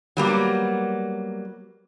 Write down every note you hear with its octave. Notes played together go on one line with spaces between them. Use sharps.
F#3 G3 A#3 B3